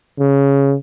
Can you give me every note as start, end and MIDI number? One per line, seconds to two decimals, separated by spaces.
0.20 0.75 49